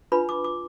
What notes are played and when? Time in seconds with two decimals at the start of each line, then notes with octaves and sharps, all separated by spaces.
0.12 D4 F4 B4 B5
0.29 D6
0.44 D6